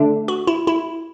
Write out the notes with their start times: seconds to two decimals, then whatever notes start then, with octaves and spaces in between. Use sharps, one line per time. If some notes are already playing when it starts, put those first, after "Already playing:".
Already playing: D3 A3 D4
0.28 F#4
0.47 E4
0.67 E4